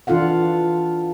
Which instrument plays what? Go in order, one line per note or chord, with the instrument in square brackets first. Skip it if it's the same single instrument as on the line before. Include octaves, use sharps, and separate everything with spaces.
[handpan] E3 D4 F4 A4 F5 F#5